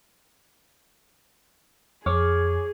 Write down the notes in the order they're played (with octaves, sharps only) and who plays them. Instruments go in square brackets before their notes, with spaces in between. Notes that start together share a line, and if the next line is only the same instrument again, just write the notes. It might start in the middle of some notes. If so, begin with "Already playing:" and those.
[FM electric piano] F2 [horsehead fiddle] G#4 [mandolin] C#5 D6 F6